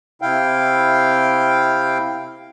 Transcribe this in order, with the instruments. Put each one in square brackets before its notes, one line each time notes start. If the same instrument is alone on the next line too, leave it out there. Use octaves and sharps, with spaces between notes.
[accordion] C3 E4 F5 G5